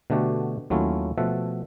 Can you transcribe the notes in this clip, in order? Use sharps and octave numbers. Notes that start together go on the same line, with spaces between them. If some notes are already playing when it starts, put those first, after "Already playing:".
B2 D3 A3 F#4 G4
D#2 F#3 A3 C#4 E4 F4
B2 F3 A3 E5 F#5